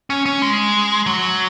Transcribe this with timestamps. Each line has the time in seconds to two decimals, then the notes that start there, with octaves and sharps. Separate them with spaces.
0.10 C#4
0.26 C#4
0.42 G#3
1.06 F#3